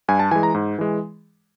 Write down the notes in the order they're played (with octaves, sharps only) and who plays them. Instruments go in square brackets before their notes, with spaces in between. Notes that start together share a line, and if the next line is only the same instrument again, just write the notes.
[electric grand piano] G2 G#5
A5
E3 G#5
G#3
A#5
G#2
E3 G#3